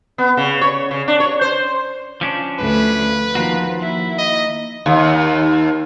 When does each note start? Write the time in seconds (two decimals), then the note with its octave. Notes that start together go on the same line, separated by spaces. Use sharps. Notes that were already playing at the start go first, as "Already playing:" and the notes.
0.18 B3
0.37 C#3
0.61 C#5
0.91 C#3
1.08 D4
1.20 C#5
1.41 C5
2.21 F3 C#4 D4
2.59 D2 B4
3.35 D#3 F3 A#3 F#4
3.81 E4
4.18 D#5
4.86 D#2